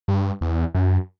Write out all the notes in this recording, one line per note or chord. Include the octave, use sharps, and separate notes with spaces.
G2
E2
F#2